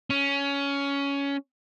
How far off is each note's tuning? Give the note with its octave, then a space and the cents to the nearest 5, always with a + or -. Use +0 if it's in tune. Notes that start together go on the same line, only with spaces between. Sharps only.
C#4 +15